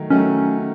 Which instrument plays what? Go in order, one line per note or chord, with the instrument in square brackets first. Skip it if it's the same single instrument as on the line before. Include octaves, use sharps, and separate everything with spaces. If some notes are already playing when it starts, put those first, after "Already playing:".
Already playing: [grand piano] D#3 F#3 A3
[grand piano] D#3 F#3 A3 [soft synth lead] C#4